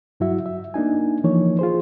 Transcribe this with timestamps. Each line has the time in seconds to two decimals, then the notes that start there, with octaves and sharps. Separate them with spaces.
0.20 G2 F#3 E4 F#4 E5
0.46 E5
0.74 A#3 D4 D#4 G#5
1.24 E3 F3 A#3 D#4 C#5
1.59 F4 G#4 C5